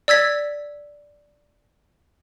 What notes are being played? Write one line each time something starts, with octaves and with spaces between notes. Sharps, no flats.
D5 E6 G#6 B6